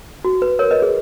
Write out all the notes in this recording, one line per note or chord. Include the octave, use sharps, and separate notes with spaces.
F#4
B4
A#4 C#5
B4 D#5
G#4